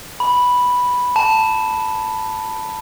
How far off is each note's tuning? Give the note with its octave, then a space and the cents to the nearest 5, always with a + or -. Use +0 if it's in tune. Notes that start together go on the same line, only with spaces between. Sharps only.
B5 -5
A5 +5